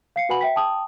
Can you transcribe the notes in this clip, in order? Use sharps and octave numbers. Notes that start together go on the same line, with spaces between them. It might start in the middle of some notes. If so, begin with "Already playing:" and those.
F5 C7 C#7
F#4 B4 F#5 G#5 B5 F#7
E5 G5 B6
G5 A5 D#6